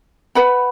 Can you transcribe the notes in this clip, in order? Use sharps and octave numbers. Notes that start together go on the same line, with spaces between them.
B4 F#5 B5